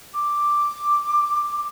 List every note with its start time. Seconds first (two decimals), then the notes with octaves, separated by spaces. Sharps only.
0.14 D6